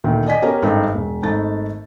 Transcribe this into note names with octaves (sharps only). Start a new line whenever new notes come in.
D2 A#2 D#3
D5 D#5 G#5 B6
B3 C#4 G4 A#4
G#1 G2 D#4 A4 G5
E1
G#1 A3 D#4 A6